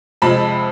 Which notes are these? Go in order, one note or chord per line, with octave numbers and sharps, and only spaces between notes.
F2 C3 F3 G#3 A5 B5